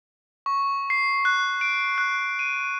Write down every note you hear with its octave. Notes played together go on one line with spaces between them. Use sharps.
C#6
C7
F#6
D7
F#6
D#7